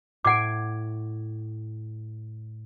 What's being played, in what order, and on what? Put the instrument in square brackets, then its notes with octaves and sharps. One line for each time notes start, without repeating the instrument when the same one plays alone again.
[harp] A2 G#6 D7 [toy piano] F#5 D6